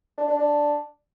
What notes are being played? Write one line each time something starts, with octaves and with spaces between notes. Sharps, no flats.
D4
D4
D4